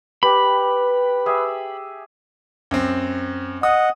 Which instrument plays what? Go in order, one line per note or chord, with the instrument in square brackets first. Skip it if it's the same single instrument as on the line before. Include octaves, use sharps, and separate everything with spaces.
[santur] G4 [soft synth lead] B4 [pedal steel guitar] B5
[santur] G4 G#4 E5
[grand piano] F#2 C4
[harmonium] D#5 F#5 [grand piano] D#6